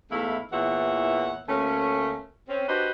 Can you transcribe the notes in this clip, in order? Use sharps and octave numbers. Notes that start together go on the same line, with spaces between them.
E2 G#2 A3 E4 E5 F5
E2 A#2 E3 C#5 E5 F#5
D2 A3 A#3 C#4
C4 C#4
D4 F#4 G4 B4 C5 D#5